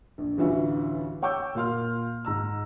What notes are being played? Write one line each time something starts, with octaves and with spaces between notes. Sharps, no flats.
A#1
A1 D2 E3 F4 F#4 E5
C#5 G5 C#6 D6 E6 G6
A#2 F4 F5 C6 F6
G#2 A#5 E6